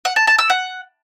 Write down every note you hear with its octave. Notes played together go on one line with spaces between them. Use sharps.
F#5
A5
A5
E6
F#5